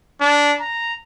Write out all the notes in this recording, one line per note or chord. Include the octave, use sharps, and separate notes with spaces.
D4
A#5